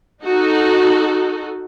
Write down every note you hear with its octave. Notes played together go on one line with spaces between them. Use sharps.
D#4 F#4 A4